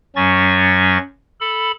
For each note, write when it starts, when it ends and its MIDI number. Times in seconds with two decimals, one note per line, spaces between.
0.16 0.98 42
0.16 0.98 54
0.16 0.98 61
0.16 0.98 85
0.16 0.98 93
1.41 1.72 69
1.41 1.72 83